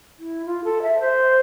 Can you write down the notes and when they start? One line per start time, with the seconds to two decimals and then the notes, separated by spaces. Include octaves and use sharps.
0.19 E4
0.45 F4
0.64 A4
0.82 E5
1.00 C5